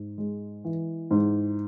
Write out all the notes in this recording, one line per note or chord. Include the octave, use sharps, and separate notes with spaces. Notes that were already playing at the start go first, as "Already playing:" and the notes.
Already playing: G#2
G#3
E3
G#2